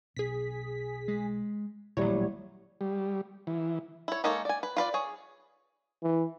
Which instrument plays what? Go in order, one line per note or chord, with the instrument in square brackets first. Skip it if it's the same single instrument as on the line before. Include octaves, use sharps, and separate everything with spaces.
[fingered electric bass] B1 B2 [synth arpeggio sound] G#4 B6
[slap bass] G#3
[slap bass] D#1 A1 [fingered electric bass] A#2 A#3 [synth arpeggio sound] F#3 C#5 [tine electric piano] G3 E4
[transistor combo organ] G3
E3
[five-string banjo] E4 C#5
G#3 A#3 D#4 A4 C#5
D5 G#5
B4
F4 B4 D5
G#4 C#5
[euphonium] E3